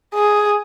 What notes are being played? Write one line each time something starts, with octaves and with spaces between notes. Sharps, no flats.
G#4